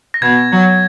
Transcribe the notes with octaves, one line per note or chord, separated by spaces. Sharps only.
A#6
B2 G#6
F#3